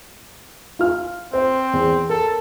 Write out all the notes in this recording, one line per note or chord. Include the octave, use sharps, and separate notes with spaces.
F4 F6
C4 C5
E2
A4 A#4